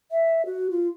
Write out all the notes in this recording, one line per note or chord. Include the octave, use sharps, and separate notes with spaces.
E5
F#4
F4